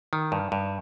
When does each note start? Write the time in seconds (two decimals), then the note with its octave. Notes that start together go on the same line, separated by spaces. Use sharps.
0.13 D#3
0.32 G2
0.52 G2